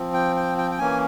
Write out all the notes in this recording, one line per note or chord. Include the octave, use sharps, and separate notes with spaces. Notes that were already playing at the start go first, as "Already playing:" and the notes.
Already playing: F3 C4
G5
G5
G5
G5
E3 A#3 C#4 G#5